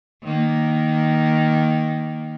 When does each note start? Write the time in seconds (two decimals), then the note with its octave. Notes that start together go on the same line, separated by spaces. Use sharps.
0.23 D#3 A#3